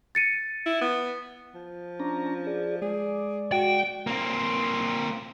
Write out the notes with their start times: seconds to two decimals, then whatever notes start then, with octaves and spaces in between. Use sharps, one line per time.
0.15 A6 C#7 D#7
0.66 E4
0.81 B3
1.55 F3
2.00 C#4 D4 A#5
2.47 G#4 D5
2.82 G#3 G#4 D5
3.52 F#4 G5
4.07 A#3 C4